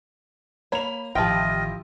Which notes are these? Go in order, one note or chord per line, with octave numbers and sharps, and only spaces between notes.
A#3 C#5 B5 F7
A1 D#3 F3 E4 F4 G4 D#5 G5